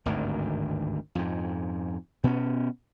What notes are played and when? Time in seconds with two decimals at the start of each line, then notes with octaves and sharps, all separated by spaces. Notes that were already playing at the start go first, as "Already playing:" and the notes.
0.06 G#1 D2 G2 D#3
1.15 F2 G#2
2.24 B2 B3 C#4